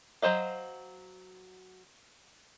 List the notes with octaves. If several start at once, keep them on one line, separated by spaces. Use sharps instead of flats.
F#3 C5 D#5 F5